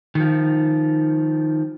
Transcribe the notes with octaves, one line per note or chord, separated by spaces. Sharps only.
D#3 F3